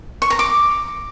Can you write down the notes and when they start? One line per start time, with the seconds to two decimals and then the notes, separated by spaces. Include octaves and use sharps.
0.22 C#6
0.30 A#5
0.39 D6